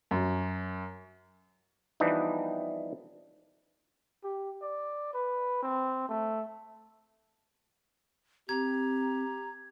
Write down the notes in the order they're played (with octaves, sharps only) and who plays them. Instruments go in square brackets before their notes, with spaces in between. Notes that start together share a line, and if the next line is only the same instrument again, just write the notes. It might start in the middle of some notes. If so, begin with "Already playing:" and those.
[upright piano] F#2
[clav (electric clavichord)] E3 F3 G3 B3 D4 D#4
[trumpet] G4
D5
B4
C4
A3
[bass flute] C4 [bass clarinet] G4 [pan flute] A#5 [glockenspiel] G#6